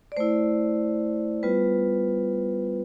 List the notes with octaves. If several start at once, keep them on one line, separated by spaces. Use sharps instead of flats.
D5
A3 E4 C5
G3 B3 F4 B4